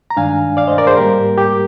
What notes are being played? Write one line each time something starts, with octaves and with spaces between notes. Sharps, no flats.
A#5
G2 D#3 G#3 D4 F5 G#5
D5 F5
C5 D#5
A#4 D5
G#4 C5
G#2 G3 A#3 G4 A#4
G4